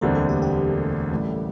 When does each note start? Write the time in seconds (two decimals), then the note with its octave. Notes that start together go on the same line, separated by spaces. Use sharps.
0.01 E1 D2 D3 G3 A#3 C4 A#4
0.15 A3 A4
0.29 G4
0.42 G4
1.11 A1 A2 G3